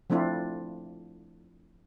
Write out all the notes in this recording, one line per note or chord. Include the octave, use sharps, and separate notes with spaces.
F3 A3 C4 D4 E4 F4